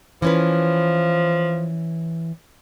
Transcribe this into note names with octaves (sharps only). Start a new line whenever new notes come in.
E3 F3 C#4 B4